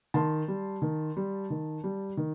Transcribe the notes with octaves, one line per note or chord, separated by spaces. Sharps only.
D#3 A5 C6
G3
D#3
G3
D#3
G3
D#3